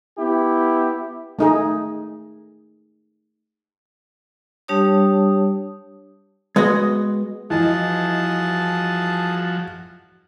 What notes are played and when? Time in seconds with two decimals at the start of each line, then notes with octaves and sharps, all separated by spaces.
0.18 B3 E4 G4
1.39 A3 D#4 G#4
4.68 G3 D4 G4 C#5 A5 D#6
6.56 G#3 B3 F#4 D#5
7.50 E3 F3 F#4 G#4 D#5 A5